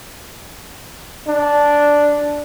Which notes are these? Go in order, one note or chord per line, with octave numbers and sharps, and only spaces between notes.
D4